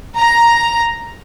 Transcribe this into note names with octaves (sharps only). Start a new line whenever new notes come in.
A#5